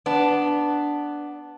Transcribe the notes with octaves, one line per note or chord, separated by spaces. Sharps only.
B3 D4